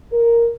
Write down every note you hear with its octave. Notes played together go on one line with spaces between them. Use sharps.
A#4